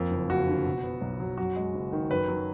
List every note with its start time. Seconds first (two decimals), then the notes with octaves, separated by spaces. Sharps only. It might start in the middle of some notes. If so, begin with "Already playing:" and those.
Already playing: F2 A#3
0.11 F#1
0.29 F#1 F#4
0.48 D3
0.65 B2
0.83 B3
1.01 B1
1.20 F#3
1.38 F#2 F#4
1.56 G#3
1.75 F#1
1.92 D#3
2.11 F#2 B4
2.28 F#3